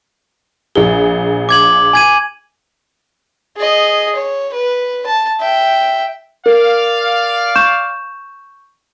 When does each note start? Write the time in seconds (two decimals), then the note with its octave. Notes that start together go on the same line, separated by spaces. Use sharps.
0.75 A#1 G#4 G7
1.49 D6 G#6 F#7
1.93 G#5 G#6 D#7
3.57 G#4 D#5
4.15 C#5
4.53 B4
5.06 A5
5.40 E5 G5
6.46 A#4 D5 F5
7.56 C#6 G6 E7